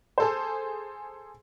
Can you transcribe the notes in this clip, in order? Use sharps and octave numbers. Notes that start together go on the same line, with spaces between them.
G#4 A4 C5